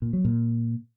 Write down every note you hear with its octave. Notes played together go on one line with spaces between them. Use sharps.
A#2
F#3
A#2